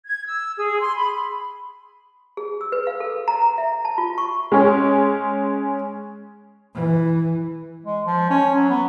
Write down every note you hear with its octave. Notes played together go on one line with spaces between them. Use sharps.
G#6
E6
G#4
C6
B5
G#4
E6
B4
F5
A4
A#5
A#5
E5
A5
F4
C#6
G#3 C#4
E3
G#3
F3
C#4
F#3
B3